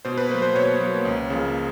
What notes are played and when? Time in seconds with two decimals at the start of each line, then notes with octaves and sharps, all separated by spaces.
0.05 B2 C5
0.17 B4
0.29 A#3 C5
0.34 F#3
0.42 C5
0.55 B2 C#5
0.81 F#3 A#3
1.05 C#2
1.30 C#3 F3 A#3